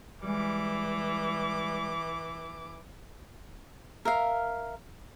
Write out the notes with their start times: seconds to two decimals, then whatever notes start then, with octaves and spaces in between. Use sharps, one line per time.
0.23 E3 G3 G#3 D6
4.05 A#4 E5 F5